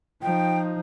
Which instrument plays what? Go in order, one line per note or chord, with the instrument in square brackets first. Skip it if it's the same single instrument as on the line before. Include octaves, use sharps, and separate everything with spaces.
[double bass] F3 D#4 [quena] G5